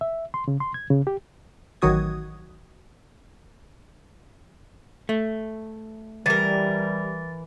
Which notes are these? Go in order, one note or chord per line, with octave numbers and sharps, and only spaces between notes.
E5
C6
C#3
C6
G#6
C#3
G4
A1 D#3 F#3 F#4 D#6 G#6
A3
E3 G3 A#4 A6